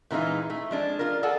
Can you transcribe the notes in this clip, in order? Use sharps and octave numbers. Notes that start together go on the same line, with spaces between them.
A#2 E3 G#3 D#4 F4
A3
F3 G#3 D4
F4 A#4
G#4 A4 D5 F#5 G#5